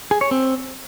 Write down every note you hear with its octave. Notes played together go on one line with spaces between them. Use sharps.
G#4
C#5
C4